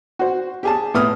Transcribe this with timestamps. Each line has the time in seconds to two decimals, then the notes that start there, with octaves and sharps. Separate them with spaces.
0.19 F#4 C5
0.63 G4 G#4 A5
0.94 A2 B3 D#6 F6